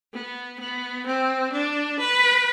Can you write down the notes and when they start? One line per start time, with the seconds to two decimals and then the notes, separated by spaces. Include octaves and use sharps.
0.14 B3
0.60 B3
1.06 C4
1.53 D4
2.00 B4